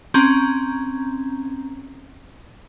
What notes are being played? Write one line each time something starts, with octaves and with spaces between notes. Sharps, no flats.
C4 C#4 A#5